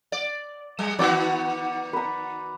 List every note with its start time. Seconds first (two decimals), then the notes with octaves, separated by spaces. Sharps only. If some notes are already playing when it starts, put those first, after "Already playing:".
0.12 D5
0.79 G3
0.99 D#3 B3 F#4 D5
1.93 B4 A#5